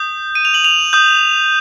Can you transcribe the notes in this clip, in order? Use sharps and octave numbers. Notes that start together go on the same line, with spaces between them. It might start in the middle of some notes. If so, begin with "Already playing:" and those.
Already playing: D#6 G6
D#7
F7
F#7
F7
D#6 G6